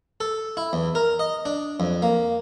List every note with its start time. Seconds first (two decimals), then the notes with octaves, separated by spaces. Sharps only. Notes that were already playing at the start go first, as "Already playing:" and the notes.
0.20 A4
0.57 E4
0.73 E2
0.95 A#4
1.19 D#5
1.45 D4
1.80 F2
2.02 A#3